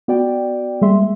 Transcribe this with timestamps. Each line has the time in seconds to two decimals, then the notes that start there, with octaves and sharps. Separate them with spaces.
0.08 B3 F#4 D5 G5
0.81 G3 G#3 A#3 G#4 E5 C6